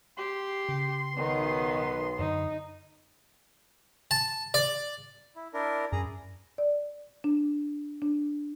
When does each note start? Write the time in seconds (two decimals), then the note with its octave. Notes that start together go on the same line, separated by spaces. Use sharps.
0.18 G4 C6
0.69 C#3
1.17 B1 D#3 B3
2.19 F#2 D3 D#4
4.11 A5
4.54 D5
5.36 E4
5.54 D4 E4 A#4
5.92 F#2 G#4 A#5
6.58 D5
7.24 D4
8.02 D4